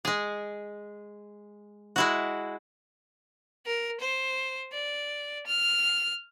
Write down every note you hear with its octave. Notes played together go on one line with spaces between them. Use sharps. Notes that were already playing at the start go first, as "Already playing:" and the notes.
G#3 G#4
G#3 E4 F#4
A#4
C5
D5
F6